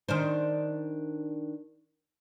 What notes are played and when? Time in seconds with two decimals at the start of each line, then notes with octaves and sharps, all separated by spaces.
0.09 D#3 D4 C5